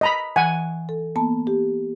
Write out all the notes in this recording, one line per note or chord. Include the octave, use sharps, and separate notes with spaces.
D#5 A#5 B5
E3 F#5 G#5
A4
A#3 B3 A5
G4